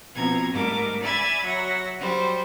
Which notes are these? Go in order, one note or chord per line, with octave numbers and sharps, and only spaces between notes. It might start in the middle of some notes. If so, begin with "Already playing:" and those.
B2 F3 C4 A#5 G#6
G#2 G3 A3 A#4 D6
D5 E5 G#5 B5 G#6 A6
F#3 E5 F#5 A#6
F#3 G3 C5